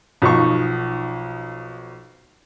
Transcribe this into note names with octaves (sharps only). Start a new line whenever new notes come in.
B1 F3 D#4 C#6